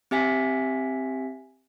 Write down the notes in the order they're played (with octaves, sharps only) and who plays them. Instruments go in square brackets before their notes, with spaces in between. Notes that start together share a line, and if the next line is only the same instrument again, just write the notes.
[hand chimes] C4 G4 E5 G#5 B6